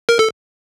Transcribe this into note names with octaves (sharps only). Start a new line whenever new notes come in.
A#4
A4